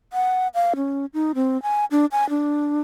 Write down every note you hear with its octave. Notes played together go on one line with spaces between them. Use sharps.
F#5
F5
C#4
D#4
C4
G#5
D4
G#5
D4